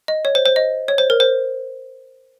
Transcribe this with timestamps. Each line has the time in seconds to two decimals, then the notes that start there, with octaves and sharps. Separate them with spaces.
0.08 D#5
0.25 C#5
0.35 C5
0.46 C5
0.56 D#5
0.88 C#5
0.98 C5
1.10 A#4
1.20 C5